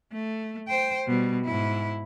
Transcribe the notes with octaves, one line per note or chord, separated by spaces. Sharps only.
A3
C5 G5
B2 G3
G#2 E4